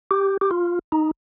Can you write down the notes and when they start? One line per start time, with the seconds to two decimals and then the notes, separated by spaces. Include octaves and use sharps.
0.11 G4
0.41 G4
0.51 F4
0.92 D#4